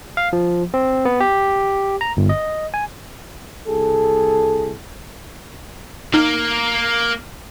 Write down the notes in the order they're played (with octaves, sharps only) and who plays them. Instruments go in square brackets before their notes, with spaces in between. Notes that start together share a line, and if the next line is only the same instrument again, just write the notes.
[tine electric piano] F5
F3
C4
B3
G4
A#5
G1
D#5
G#5
[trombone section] C2 G#4 A4
[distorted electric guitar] A#3 [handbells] D#4 F6